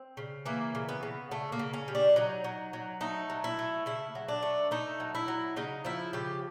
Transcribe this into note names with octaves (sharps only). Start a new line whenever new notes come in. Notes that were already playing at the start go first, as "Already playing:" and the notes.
Already playing: C4
C#3
E3 A#3
C#3
B3
C#3
C#3 A3
A#3
C#3
C#4
G3
D4
F#3 D#4
F#3
F#3
A3 D#4
F#3
E4
A3
C#3 E4
F#3
D4
A3
A3 D#4
F#3
E4
F#3
C#3 D#4
F3 E4
C#3 G4